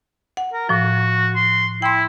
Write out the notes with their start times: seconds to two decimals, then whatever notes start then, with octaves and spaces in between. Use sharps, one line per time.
0.37 F#5
0.53 A#4
0.69 A2 F3 F#4
1.35 C6
1.82 E4 G5 C6